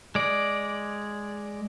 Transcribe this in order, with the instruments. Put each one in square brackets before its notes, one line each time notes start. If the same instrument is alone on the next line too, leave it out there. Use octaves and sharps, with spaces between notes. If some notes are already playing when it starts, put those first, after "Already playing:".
[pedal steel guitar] G#3 D5